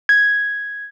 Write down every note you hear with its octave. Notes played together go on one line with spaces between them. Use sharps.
G#6